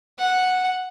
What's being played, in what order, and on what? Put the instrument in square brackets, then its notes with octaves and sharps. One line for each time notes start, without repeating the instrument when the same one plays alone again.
[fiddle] F#5